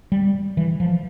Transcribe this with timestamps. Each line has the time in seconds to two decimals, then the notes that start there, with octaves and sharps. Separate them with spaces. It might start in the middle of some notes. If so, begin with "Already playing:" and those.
0.12 G3
0.57 E3
0.80 F3